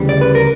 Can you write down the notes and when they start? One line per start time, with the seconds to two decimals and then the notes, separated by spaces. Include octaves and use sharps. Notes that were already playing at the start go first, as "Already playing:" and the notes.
Already playing: D2 C#3 E3 G3
0.09 D5
0.21 B4
0.35 A#4